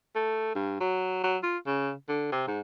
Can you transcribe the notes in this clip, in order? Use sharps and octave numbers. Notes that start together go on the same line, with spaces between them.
A3
G2
F#3
F#3
F4
C#3
D3
C3
G#2